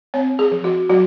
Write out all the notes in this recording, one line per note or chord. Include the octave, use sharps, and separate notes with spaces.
C4 C#5
G#4
F3
F#4
F#3 F#4